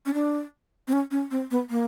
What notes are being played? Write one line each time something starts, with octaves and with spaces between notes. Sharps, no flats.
C#4
D4
C4
C#4
C#4
C4
B3
A#3